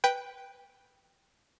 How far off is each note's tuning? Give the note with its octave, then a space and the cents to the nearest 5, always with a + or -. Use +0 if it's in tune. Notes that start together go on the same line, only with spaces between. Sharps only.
B4 -5 G5 +0